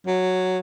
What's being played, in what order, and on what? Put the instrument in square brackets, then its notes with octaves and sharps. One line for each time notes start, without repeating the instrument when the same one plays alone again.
[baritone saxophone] F#3